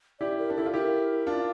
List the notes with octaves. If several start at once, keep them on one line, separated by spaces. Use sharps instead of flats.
E4 G4 D5
A#4
D4
E4 A4
F4
E4 G4 A#4
D4 F4